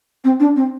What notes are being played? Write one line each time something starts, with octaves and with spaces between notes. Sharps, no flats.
C4
D4
C4